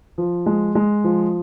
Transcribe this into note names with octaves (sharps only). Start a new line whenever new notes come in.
F3
G#3
G#3
F3